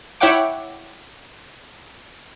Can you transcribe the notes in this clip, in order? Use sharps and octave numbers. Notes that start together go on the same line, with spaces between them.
E4 C#5 E5 F#5 G5 D6